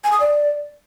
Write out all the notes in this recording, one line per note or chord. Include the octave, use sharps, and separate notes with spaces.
G#5
D#6
D5